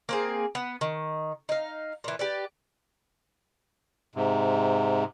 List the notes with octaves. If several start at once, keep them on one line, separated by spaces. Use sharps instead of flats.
A#3 C4 G#4
B3
D#3
D#4 F5
A#2 E3
G4 B4 D5
G#2 C3